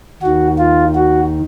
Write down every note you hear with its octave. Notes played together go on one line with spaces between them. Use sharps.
D#2 D#3 F#4
F4
F#4